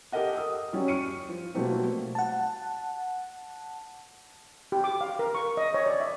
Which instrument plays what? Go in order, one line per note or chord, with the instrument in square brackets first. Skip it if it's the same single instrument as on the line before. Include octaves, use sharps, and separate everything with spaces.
[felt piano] G4 A4 A#4 D#5 F#5
D#6 E6
F#3 G3 C#4
C#6 F6 C#7 D#7
F3
B2 F#3 G3 A3 A#3 C4
[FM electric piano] F#5 A5
[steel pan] G4
D6
F5
A#4
C#6
D#5
C#5
D5
E5